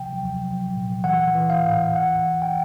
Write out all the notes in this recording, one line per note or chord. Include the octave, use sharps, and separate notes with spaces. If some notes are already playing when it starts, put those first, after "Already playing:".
Already playing: C3 F3 G5
F#3
F#3
A#2
E3 F#5
E3
F5
A2
E3 F#5
E3
G5